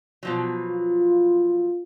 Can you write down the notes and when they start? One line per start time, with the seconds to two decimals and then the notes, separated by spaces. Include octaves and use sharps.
0.23 B2 F3 F#3
0.69 F4